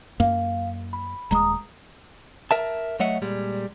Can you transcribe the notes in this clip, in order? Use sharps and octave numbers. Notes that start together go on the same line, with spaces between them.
F#2 A#3 F5
B5
D#1 G#3 A#5 D#6
A#4 E5 A5
F#3 A3 C#5 D#5 E5 F#5
A#2 G3 G#3